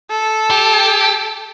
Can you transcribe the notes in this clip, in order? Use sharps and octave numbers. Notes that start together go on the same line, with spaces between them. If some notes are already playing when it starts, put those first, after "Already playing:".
A4
G4